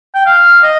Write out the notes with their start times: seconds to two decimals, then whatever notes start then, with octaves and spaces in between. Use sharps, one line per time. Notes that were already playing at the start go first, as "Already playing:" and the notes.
0.14 G5
0.26 F5
0.63 D#5